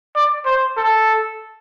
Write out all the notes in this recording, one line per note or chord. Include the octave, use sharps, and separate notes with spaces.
D5
C5
A4